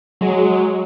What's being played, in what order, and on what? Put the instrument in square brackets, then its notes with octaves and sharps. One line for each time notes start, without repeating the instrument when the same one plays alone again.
[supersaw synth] F#3 G#3